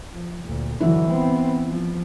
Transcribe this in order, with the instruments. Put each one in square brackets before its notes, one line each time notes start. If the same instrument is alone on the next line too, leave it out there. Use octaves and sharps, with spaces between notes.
[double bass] F3
D2 A#2
[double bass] D3 F#3 [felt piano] E3 E4
[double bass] B3 C4
F3